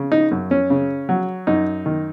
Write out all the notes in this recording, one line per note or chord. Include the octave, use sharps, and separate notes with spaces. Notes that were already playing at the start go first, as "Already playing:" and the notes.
Already playing: C#3
D#4
F#2
C#4
C#3
F#3
F#2 D#4
D#3